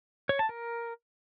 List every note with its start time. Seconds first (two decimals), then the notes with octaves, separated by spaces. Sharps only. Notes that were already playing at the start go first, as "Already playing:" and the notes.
0.29 C#5
0.39 A5
0.49 A#4